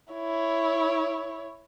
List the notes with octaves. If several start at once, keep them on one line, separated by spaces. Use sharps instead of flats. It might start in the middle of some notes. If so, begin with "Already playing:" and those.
E4 C#5